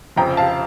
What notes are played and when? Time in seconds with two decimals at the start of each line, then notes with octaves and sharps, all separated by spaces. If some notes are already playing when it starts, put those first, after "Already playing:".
0.16 F1 F2 C#3 F3 G5 A#5
0.37 F5 A5